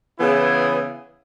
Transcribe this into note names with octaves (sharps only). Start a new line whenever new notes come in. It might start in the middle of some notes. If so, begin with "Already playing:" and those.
C#3 E3 B3 E4 G#4